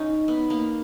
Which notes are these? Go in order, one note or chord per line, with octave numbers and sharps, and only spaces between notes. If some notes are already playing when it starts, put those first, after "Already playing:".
Already playing: C#4 D#4
B3
A#3